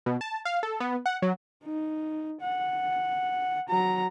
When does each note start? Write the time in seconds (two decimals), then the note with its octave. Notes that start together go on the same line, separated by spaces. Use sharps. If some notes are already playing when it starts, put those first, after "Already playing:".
0.06 B2
0.21 A5
0.45 F5
0.63 A4
0.80 B3
1.06 F#5
1.22 F#3
1.64 D#4
2.41 F#5
3.69 F#3 A#5